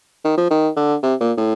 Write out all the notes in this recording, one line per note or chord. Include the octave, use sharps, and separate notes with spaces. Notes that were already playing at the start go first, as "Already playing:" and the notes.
D#3
F3
D#3
D3
C3
A#2
A2